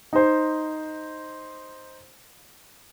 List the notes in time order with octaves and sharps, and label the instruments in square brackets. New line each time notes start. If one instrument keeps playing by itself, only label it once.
[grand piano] D#4 C5